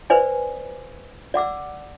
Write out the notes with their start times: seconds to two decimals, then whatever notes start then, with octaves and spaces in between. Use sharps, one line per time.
0.10 B4 C5 D5 G#5
1.34 D5 F#5 D6 E6